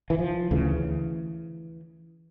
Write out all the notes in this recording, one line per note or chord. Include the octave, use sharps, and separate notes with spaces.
E3
F3
D2 C#3 E3